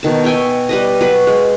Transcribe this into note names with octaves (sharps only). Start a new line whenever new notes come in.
B2 D#3 A5
C#5 E5 G5 G#5
G3 B4 D#5
F#3 B4
G#3